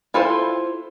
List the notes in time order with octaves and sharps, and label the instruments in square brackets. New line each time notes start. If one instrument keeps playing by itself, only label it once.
[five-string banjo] E4 F4 A4 C5